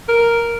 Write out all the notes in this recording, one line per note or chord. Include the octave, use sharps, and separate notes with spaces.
A#4